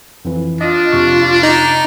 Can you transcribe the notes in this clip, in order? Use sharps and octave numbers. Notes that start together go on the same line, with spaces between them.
F2 E3
D4 F4 D#5 D#6
F2 C3 C#6
D#4